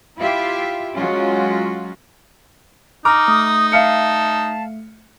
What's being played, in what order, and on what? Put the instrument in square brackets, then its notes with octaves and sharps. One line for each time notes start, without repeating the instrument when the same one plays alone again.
[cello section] E4 F4 G4 E5 F5
F#3 G#3 C#4 F4 F#4
[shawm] D#4 [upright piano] A#5 [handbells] D6 F6
[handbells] A3 [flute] D#6
[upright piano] E5 F5 C#7 [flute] A5